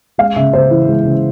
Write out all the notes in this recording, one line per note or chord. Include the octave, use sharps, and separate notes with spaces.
G#3 F5
C#3 E5
C#3 C5
E3
G#3
C#3